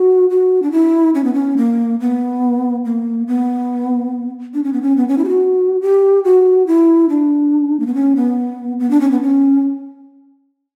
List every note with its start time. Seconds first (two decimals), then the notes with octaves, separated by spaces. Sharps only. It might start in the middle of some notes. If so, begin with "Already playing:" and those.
Already playing: F#4
0.30 F#4
0.62 D4
0.72 E4
1.15 C#4
1.24 B3
1.34 C#4
1.57 A#3
2.00 B3
2.85 A#3
3.27 B3
4.54 D4
4.64 C#4
4.73 B3
4.82 C#4
4.97 B3
5.08 C#4
5.18 E4
5.25 G4
5.29 F#4
5.81 G4
6.25 F#4
6.67 E4
7.09 D4
7.80 A#3
7.87 B3
7.95 C#4
8.16 B3
8.80 B3
8.90 D4
9.01 C#4
9.11 B3
9.22 C#4